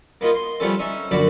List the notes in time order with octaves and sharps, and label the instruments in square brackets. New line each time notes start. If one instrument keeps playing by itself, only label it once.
[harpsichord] A#3 B3 D#4 F4 D#5
C6
F3 G3 A3 B3 C#4 A4
C#4 D#4 E5
A#1 F#2 D3 F#4 D5 B5